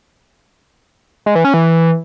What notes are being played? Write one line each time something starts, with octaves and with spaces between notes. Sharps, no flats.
G#3
E3
C#4
E3